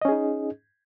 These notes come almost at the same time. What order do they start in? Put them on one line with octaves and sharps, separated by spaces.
D#5 C#4 G#4 D#4